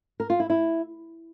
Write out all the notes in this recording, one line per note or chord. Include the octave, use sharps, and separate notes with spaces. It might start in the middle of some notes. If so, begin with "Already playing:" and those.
A#4
F4
E4
E4